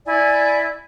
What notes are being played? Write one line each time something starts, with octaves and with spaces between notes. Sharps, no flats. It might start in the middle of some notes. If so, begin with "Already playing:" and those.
E4 D5 G#5